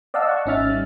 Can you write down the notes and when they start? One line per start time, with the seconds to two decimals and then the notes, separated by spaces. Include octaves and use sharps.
0.14 D5 D#5 F5 F#5 A5 E6
0.29 F#5 C#6
0.46 G#1 C#4 D#4 E5 F6 A6
0.69 G3